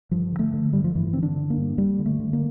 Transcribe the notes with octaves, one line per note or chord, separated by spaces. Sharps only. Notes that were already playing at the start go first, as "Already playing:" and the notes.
G2 F3
D3
A3
D3
G2 G3
F3
G2 E3
D3 C4
D4
D3
A#3
G2
G2 G3
D3
A3
D3
A#3